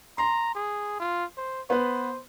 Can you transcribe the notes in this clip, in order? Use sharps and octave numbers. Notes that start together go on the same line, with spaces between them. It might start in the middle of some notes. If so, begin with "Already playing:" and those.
A#5 C6
G#4
F4
C5
B3 B4 C5